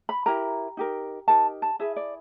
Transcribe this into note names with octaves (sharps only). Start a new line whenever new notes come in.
B5
E4 G4 A#4 A#5
D#4 G4 A#4
D#4 G4 A#4 A5
A5
E4 G#4 B4 E5
D5